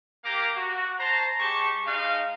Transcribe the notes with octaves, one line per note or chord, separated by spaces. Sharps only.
A#3 G4 F5 A#5 D6
F#4
C5 A5 A#5
G#3 G4 A5 C#6
G#3 D#4 F5